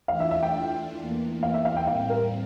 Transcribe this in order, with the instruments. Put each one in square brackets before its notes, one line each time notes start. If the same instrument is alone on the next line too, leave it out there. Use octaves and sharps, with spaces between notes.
[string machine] E3 A3 D4 F4 [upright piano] F5
[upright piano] E5
E5
G5
[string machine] E2 E3 A#3
[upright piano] F5
E5
F5
G5
[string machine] A2 G3 C4 [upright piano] F5
[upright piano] A#4